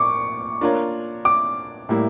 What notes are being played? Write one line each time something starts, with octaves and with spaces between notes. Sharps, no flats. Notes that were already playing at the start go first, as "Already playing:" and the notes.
Already playing: A#2 C#6 D6
A#3 D4 F4 A#4 C#5
D6
A2 G3 A#3 E4